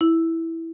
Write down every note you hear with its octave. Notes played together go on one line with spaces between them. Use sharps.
E4